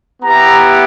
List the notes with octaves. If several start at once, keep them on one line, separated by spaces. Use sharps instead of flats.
B3 E4 G4 A#5